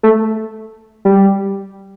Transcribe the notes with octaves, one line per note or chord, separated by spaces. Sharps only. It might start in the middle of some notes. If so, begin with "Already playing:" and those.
A3
G3